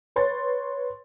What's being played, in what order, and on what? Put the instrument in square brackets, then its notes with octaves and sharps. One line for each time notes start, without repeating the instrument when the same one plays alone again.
[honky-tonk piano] B4 C#5 C6 A6